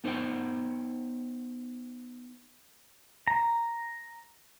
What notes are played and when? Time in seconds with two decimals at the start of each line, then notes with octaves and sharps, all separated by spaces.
0.04 B3 D#4 C5 F#5 G5
3.27 A#5